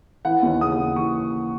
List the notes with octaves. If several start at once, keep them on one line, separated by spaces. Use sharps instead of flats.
E3 F#5
D#2
C#3 D#6
D#2
E3 C#6